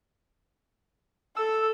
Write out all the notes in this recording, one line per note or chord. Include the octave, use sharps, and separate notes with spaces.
A4 E6